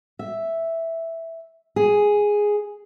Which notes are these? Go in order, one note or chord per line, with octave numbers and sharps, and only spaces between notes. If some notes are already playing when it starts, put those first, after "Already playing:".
E5
G#4